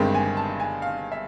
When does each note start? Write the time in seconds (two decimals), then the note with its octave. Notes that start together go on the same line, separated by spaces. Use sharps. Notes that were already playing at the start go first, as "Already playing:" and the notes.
Already playing: G1 G2 D#3 G#3 C4
0.14 G#5
0.37 A5
0.60 G#5
0.82 F5
1.12 E5